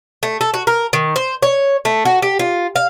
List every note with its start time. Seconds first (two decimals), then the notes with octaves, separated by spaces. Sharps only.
0.23 A3
0.41 A4
0.54 F#4
0.67 A#4
0.93 D#3
1.16 C5
1.42 C#5
1.85 A3
2.05 F#4
2.22 G4
2.39 F4
2.76 F5